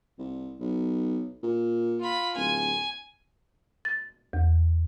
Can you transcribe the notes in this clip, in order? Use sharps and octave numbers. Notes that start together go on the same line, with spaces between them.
C2
B1
A#2
F4 B5
D1 G#5
A6
E2